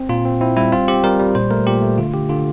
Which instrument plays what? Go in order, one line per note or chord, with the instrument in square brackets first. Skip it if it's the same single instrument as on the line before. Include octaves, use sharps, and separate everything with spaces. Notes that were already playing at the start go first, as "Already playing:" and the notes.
Already playing: [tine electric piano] C4
A#2 F4
C4
C4 E4
G3 E4
C4 F4
C4 G4
G3 A#4
G3
A#2 C5
A3 A#4
A#2 G4
A3
D3 F4
D3 G4
D3 F4